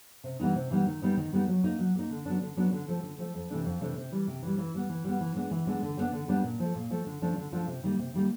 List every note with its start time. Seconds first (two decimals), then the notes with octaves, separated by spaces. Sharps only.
0.24 C3
0.39 E3 G3 B3 D#4
0.55 C3
0.71 E3 G3 B3 D#4
0.87 D#3
1.02 G3 B3 D#4
1.17 D#3
1.33 G3 B3 D#4
1.48 F#3
1.64 A#3 D#4
1.79 F#3
1.95 A#3 D#4
2.10 D3
2.26 F#3 B3 D4
2.41 D3
2.57 F#3 B3 D4
2.72 D3
2.88 F3 A3
3.03 D3
3.18 F3 A3
3.35 F2
3.50 C3 E3 A3 D4
3.65 F2
3.81 C3 E3 A3 D4
3.97 C3
4.12 E3 G3
4.27 C3
4.42 E3 G3
4.58 E3
4.74 G3 B3
4.89 E3
5.04 G3 B3
5.21 E3
5.35 G#3 B3 D4
5.51 E3
5.67 G#3 B3 D4
5.83 D3
5.97 G3 B3 D4
6.13 D3
6.28 G3 B3 D4
6.43 A#2
6.60 F3 A3
6.75 A#2
6.91 F3 A3
7.06 D3
7.22 F3 A3 D4 F4
7.37 D3
7.52 F3 A3 D4 F4
7.68 C3
7.83 D#3 G3 A#3
7.99 C3
8.14 D#3 G3 A#3